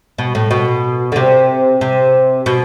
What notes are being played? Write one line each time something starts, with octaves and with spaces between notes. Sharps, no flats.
B2
A2
B2
D3
C3
C3
B2